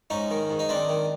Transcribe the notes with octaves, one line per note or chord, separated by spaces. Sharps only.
G#2 C#4 D#4
D#3
G#2
D#4
D#3 C4 D4
D#3